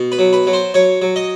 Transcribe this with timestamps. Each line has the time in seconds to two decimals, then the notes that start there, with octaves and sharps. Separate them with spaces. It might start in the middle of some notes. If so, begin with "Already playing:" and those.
Already playing: B2
0.12 B4
0.19 F#3
0.33 B4
0.47 F#3
0.53 C5
0.74 F#3 C#5
1.02 F#3
1.16 D#5